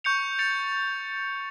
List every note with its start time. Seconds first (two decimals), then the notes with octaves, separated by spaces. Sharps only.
0.04 C#6 G6 C#7 F7
0.39 A6 C#7 F7